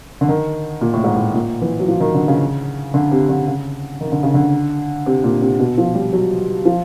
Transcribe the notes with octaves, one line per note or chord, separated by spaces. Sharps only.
D3
D#3
A#2
A2
G#2
A2
A#2
E3
F#3
F3
D#3
D3
C#3
D3
C3
D3
C#3
D#3
D3
C#3
D3
C3
A#2
C3
B2
F3
G3
F#3
F3